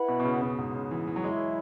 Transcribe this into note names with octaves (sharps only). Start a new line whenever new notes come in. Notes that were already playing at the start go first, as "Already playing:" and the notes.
Already playing: E4 B4 F#5 B5
B2
B2
C#3
B2
G#2
C#3
E3
E3
F#3
G#3 E4 G#4 C#5